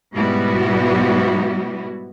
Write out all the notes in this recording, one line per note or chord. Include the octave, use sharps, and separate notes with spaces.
G#2 B2 G3 B3 E4 F#4